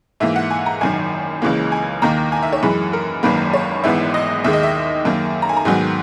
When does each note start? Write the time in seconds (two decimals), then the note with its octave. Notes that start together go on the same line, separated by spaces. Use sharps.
0.20 G#2 E3 A#3 E5
0.36 F#5
0.51 G#5
0.66 A#5
0.81 G#1 F#2 D#3 G#5
1.42 C#2 C#3 E3 A#3
1.72 G#5
2.02 D#2 D#3 A#3 A#5
2.32 G#5
2.43 E5
2.53 C#5
2.63 F#2 E3 G#3 B4
2.93 A#4
3.23 G#1 F#2 D#3 A#3 B4
3.53 C#5
3.84 G#1 G#2 E3 B3 E5
4.14 D#5
4.44 D#2 D#3 G#3 E5
4.53 D#5
4.63 E5
5.05 F#2 D#3 A#3
5.42 A#5
5.49 G#5
5.57 A#5
5.65 G#2 D#3 F#3 B3 G#5